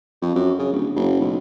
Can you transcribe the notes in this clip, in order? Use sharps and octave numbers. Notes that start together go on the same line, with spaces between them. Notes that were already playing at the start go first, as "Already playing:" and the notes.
F2
F#2
C#3
D1
F#1
B1